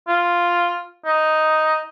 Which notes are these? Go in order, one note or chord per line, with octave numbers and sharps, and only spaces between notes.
F4
D#4